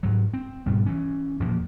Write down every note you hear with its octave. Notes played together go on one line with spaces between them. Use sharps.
G#2 F#3
C4
G#2 B2 G3
E3 C#4
E2 A#2 F3 A#3